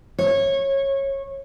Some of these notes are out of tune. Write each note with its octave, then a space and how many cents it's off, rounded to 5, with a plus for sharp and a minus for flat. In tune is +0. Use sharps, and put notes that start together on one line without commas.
C#5 -20